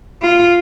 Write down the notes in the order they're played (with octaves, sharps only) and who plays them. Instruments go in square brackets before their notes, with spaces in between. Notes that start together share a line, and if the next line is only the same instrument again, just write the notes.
[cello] F4